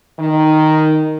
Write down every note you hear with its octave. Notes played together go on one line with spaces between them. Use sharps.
D#3